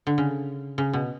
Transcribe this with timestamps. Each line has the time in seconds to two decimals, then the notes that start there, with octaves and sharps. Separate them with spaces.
0.07 D3
0.18 C#3
0.78 C#3
0.93 B2